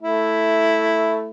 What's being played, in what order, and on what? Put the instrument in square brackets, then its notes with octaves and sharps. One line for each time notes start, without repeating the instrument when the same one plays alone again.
[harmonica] A3 E4